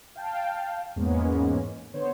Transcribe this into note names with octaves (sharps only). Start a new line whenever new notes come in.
F5 G5 A5
E2 G#2 G#3 A#3 B3 C#4
D3 B3 C5 C#5